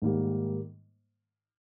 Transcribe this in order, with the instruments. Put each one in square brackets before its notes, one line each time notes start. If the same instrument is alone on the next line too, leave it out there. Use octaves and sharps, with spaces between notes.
[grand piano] G#2 D#3 G3 A#3